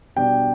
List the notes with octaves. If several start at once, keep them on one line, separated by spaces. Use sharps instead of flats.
B2 G3 D4 G5